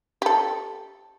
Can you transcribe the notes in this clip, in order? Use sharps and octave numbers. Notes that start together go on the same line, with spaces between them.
G4 A4